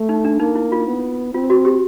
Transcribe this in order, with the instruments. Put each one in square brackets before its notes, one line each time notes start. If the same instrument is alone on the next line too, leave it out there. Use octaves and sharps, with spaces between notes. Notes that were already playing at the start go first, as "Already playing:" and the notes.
Already playing: [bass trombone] A3
[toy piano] D#4
D4
[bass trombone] A#3 [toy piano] D#4
[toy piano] E4
F4
[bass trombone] B3
[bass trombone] C4 [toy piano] F4
[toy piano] F#4
G4